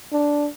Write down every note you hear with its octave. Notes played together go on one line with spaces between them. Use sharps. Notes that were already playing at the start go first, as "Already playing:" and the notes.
D4